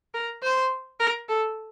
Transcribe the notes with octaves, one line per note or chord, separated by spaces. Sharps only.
A#4
C5
A#4
A4